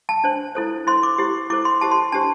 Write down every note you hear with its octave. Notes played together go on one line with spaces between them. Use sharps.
A5
D4 C5
E4 A4 C5
E4 C5 C6
D6
E4 G4 C5
E4 A4 C5 D6
C6
E4 G4 C5 A5
C6
D4 G4 C5 A5